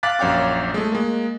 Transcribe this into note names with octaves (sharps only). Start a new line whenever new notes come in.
F5 D6 F#6 A6 B6
A#1 F#2 C#5 F5 G5 D6
G#3 A3
G#3 A#3